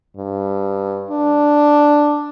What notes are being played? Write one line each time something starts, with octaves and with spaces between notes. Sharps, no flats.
G2
D4